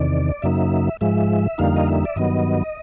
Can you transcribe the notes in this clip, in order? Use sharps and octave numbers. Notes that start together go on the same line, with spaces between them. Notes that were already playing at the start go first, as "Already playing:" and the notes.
Already playing: E2 C3 D#3 D5
F#2 C#3 F#3 A#3 D#4 E5
G#2 F3 G#3 E5
F2 D3 G3 A#3 D#4 F5
D#5
E5
D5
G2 D#3 F#3 B3 D#5